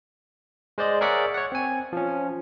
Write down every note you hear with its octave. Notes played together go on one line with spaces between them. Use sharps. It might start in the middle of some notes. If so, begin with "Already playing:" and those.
G#3 C5 D5 D#5
G#4 A#4 C#5 D5 E5 F#5
C#5 F#5
C4 G#5
F3 C#4